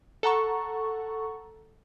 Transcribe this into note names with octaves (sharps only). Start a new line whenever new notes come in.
A4 F#5 A#5 C#6